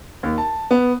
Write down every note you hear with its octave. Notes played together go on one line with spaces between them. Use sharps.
D#2
A5
B3